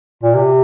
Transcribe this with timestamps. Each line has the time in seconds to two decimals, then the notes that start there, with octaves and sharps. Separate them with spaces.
0.23 A#2
0.35 C3